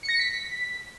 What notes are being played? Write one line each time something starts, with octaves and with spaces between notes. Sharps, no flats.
C#7
A#6
C#7
B6